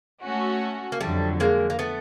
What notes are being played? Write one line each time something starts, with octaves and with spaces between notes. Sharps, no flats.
A3 C#4 F#4
A#3
F2 D3 F#3 G3 A3
G#3 A#3
A#3
A3 B3